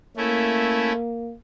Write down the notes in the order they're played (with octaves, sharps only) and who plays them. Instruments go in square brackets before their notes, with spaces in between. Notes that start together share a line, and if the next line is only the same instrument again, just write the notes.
[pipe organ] A3 C#4 E4 [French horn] A#3